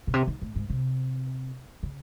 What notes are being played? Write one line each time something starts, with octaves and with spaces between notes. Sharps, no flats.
B2
C3
D#3
A2
G#2
C3
C#3